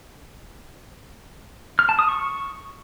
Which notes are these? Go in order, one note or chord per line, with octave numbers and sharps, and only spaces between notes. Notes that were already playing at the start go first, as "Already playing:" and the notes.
F6
A5
D#6
C#6